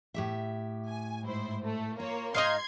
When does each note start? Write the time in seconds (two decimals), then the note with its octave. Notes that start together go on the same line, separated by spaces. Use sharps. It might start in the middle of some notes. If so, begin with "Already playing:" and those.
0.14 A2 G4 E5
0.87 G#5
1.24 G#2 E4 C5
1.65 A3
2.00 A#3 F4 C#5
2.35 G#2 D#4 D#5 F5 C6 G#6